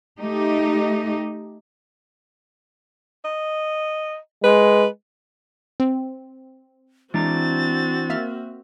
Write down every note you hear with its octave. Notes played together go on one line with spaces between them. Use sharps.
A3 D#4 G4
D#5
G#3 B4
C4
E3 G#3 C4 D4 F#4 A#5 A6
A#3 E5 F6